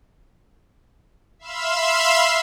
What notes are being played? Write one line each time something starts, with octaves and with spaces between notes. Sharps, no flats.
E5 F5 B5 C6 E6